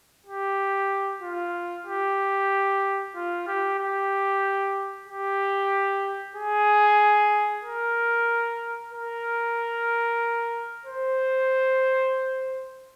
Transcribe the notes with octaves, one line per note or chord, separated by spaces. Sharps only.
G4
F4
G4
F4
G4
G4
G4
G#4
A#4
A#4
C5